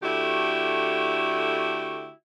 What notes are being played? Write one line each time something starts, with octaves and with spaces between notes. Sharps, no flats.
D3 A3 E4 F#4 G4